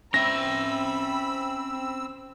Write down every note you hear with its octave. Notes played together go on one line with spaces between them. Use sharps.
C4 C#4 E5 B5 E6 A#6